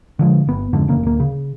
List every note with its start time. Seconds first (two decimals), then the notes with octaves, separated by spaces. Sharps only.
0.19 D3 F3 F#3 G#3
0.47 G1 B3
0.73 F2 G#2 D3
0.88 F1 E2 C#3 A#3
1.03 D1 D2 A#3
1.20 C#3